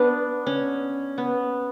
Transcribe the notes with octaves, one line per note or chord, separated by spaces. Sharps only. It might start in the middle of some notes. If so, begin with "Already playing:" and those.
Already playing: B3 D4
C#4
B3